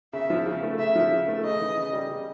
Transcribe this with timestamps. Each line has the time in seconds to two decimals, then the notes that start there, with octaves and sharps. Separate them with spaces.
0.13 C#3 E5
0.30 F3
0.46 C#3
0.63 A3
0.79 C#3 E5
0.95 F3
1.12 C#3
1.28 A3
1.44 C#3 D#5
1.60 E3
1.77 C#3
1.93 G3
2.10 C#3